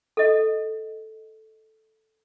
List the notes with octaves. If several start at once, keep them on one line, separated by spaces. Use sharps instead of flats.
A4 D#5